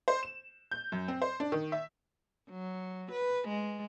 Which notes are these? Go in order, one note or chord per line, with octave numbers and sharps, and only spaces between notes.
C5
E7
G6
F#2
C4
C5
D4
D#3
E5
F#3
B4
G#3